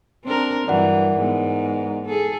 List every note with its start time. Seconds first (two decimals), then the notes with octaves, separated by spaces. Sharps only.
0.25 C4 D4 A#4
0.67 G2 E3 F#3 A#4 D5 F#5
1.17 G#2 B3
2.06 G#4 A4